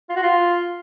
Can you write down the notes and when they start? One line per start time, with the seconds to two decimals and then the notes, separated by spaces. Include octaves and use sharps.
0.09 F4
0.16 F#4
0.22 F4